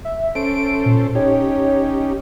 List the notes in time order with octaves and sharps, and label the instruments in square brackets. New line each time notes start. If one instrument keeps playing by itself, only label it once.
[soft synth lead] E5
[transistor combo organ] C#4 A4 C5 [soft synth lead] D7
[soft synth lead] A#2
[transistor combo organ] C#4 D#4 G4 [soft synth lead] C#5